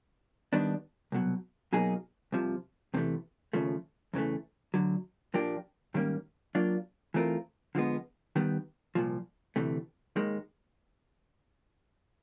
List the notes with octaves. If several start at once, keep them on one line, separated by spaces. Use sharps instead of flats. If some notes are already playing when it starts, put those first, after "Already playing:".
D#3 G3 B3 D4
C2 B2 F#3
B2 F#3 A#3 D#4 G#4
C2 C3 F3
E2 C3 E3 A3
D#2 C#3 F3 A3
E2 C#3 E3 A3
D2 D3 F#3
A#2 F3 A#3 D4 G4
G#2 D#3 G3 A#3 C#4
F#3 A#3 D4 F4
E3 A3 C4 F4 A#4
D3 F3 G#3 B3
D#3 G3 B3
C2 A#2 F3
D2 C3 E3 A3
D#2 D#3 G#3